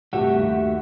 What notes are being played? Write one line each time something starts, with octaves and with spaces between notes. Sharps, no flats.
G2 C3 A3 F#4 G4 E5
D#2